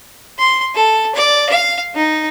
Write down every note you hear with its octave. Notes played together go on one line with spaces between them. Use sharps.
C6
A4
D5
F5
D#4